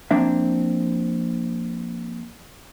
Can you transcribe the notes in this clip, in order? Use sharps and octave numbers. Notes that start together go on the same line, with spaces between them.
F3 A#3 C4 D4 E5